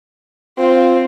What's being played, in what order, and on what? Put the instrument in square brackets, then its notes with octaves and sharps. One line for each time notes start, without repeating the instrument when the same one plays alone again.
[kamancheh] C4 [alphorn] F4